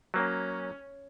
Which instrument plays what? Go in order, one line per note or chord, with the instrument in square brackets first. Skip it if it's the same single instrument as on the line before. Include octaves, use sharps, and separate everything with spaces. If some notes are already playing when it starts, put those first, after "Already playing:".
[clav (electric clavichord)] F#3 A#3 [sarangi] C#4